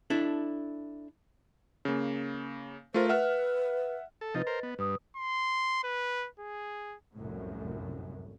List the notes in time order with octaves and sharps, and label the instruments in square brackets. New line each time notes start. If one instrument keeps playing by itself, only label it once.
[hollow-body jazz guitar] D4 E4 A4
[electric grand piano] C#3 A#3
[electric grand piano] A3 F4 A#4 [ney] C5
[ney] B4 [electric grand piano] E5 F#5 F6
[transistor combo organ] A4
[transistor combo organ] C3 F3 D#4 [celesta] B4 D#5 A6
[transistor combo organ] A#4 C5
B3
[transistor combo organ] G2 [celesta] B4 D#6
[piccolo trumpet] C6
B4
G#4
[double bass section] F1 C2 F#2 A2